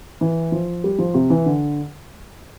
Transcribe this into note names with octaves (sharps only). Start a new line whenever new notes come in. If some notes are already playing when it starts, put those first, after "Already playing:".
E3
F3
G3
F3
C3
E3
D3